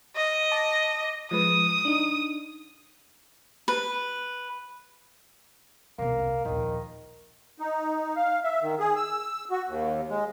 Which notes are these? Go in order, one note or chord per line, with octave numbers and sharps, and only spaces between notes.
D#5
A5 D6
F3 G#3 B4 D#6
D4 D#4
B4
E1 C2 A#3
A#1 D#2 D#3
D#4
F5
E5
D#3
G#4
E6
F#4
D#2
G#3